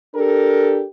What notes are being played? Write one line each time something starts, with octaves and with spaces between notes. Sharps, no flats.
D4 G4 A4 A#4